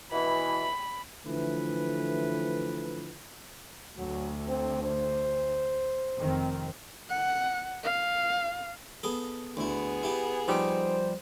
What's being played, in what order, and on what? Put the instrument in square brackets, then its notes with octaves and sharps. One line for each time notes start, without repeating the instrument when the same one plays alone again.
[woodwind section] B2 E3 [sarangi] B5
[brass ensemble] D3 E3 F3 A3 B4
[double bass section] D2 [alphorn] F#3
[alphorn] C4
C5
[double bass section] F1 D#3 C4
[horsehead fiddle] F#5
F5
[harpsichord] B3 G#4 A4
[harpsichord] D2 E4 [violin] B3 G#4
[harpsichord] E4 G4
[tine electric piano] F3 G3 G4 [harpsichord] C4 D#4 [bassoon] C5